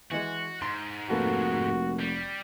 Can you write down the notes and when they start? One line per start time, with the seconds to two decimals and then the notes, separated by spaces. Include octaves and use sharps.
0.11 E3 G#3 F#4
0.62 G#2 C6
1.10 F1 A#3 F#4 A4 B4
2.00 G3